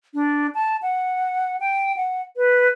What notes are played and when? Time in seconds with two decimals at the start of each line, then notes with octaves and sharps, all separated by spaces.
0.14 D4
0.54 A5
0.82 F#5
1.60 G5
1.96 F#5
2.37 B4